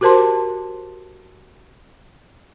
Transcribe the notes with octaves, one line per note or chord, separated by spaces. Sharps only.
F#4 G4 A#4 C5 A5 C6